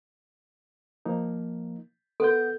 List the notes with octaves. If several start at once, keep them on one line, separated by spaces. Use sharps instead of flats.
F3 A#3 D#4
B3 A4 F#5 G6